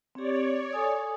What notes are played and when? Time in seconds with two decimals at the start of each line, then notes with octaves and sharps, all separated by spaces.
0.15 C4 G4 C#5 D5
0.73 A4 G#5 D#6